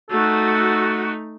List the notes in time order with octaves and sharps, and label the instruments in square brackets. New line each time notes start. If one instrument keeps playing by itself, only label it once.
[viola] A3 D#4 [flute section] F#4 [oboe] A4